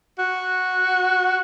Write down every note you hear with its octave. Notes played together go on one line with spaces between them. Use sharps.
F#4